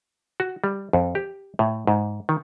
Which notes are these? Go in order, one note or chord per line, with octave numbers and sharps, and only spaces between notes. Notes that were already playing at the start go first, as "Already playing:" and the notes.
F#4
G3
F2
G4
A2
G#2
D#3